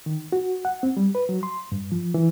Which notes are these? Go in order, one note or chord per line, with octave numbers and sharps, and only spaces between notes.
D#3
F#4
F#5
C4
G3
B4
F#3
C6
G2
F3
E3